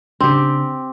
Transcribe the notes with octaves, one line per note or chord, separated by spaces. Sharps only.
C#3 C4 D4 G4